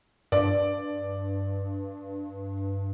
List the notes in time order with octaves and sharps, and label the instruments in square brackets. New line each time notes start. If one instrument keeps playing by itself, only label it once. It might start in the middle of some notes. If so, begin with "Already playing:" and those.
[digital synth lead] G2 [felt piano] D5